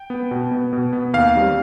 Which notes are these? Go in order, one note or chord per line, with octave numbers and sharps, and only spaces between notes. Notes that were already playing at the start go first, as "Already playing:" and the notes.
Already playing: G5
B3
B2
B3
B2
B3
D#2 F5
D#3 G3 C4